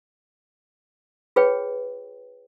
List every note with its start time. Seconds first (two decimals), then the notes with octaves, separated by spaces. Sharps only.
1.36 F4 G#4 B4 C#5 G5